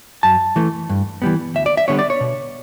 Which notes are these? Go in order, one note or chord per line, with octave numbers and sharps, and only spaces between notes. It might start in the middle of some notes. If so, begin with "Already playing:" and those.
F#2 A5
E3 A3
G2
E3 G3 B3
D2 E5
D5
E5
D3 G3 B3 C#5
D5
C#5
B2